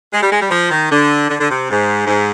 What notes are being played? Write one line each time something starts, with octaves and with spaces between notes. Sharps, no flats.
G#3
G3
G#3
G3
F3
D#3
D3
D3
D3
C3
G#2
G#2